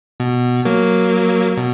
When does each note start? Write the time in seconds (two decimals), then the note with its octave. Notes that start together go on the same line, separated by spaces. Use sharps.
0.20 B2
0.65 F#3 A#3
1.57 B2